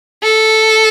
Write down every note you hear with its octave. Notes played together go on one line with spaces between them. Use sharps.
A4